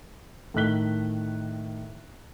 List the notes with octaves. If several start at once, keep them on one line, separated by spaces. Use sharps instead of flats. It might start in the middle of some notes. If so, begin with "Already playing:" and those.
A2 D#3 A3 F#6 B6 G7